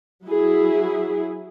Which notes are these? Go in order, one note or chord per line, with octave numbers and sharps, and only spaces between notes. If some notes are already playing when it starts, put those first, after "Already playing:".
F#3 E4 G#4